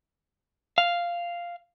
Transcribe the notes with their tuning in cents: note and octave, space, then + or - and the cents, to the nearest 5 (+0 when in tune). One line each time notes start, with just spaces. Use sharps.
F5 -5